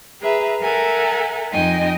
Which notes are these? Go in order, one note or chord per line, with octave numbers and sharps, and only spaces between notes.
G#4 B4 E5 A#5
A4 A#4 E5 F#5 G#5 A#5
F2 D#4 D#5 G5 G#5